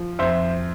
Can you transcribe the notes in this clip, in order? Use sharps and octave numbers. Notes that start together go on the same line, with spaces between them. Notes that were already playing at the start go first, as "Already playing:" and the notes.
Already playing: F3
F2 C5 E5